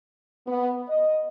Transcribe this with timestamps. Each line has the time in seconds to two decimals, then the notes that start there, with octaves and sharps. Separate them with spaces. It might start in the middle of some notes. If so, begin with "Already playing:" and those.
0.47 B3
0.88 D#5